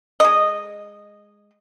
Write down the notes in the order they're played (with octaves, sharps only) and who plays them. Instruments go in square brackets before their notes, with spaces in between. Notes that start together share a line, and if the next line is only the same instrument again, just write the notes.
[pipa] G#3 D#5